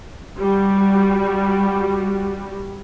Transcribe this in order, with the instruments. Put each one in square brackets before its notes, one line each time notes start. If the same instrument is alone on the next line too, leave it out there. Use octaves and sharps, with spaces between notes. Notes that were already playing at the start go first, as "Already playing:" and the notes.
[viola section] G3 F#4